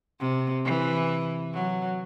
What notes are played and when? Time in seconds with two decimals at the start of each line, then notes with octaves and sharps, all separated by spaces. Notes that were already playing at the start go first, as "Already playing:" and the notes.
0.20 C3
0.65 E3
1.54 F#3